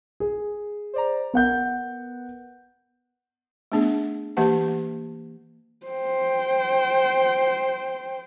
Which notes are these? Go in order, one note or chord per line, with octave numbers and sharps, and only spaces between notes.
G#4
C5 D5 A#5
B3 A#4 F#5 G6
A3 B3 D4 G#4
E3 A#3 G4 E5 F#5 A5
C5 G5